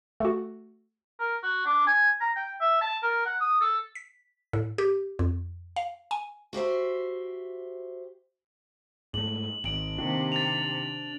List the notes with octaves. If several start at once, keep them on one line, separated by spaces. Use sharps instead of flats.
A3 F#4
A#4
F#4
D4
G#5
A#5
G5
E5
A5
A#4
F#5
D#6
A4
B6
A2
G4
F2
F5
G#5
F#4 G4 C5 E5
G#2 A3 F#7
G#1 D7 F#7
C3 D#3 A#3 D4
A6 F7